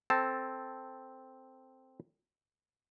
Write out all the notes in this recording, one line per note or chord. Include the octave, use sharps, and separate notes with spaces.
C4 A4 A5